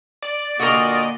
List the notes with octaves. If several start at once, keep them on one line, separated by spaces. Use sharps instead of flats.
D5
A#2 D3 A#3 F#4 A#4 D#5